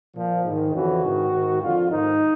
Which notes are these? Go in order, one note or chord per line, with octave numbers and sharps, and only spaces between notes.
A#2 F3
G#2 D#3
F2 C#3 E3 F#4
G#2 D#3
G#2 D#3
F2 D3 F3 F4
G#2 D#3 D#4